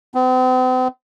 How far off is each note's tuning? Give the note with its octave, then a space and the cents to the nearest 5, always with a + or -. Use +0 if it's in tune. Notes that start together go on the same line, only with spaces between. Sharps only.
C4 -45